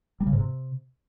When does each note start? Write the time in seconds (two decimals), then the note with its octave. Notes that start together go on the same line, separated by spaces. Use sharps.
0.20 G3
0.27 C#3
0.33 G#2
0.39 C3